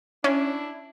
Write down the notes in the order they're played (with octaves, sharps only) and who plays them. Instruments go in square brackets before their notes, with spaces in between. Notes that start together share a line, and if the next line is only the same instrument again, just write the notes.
[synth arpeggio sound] C#4 [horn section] D4 E4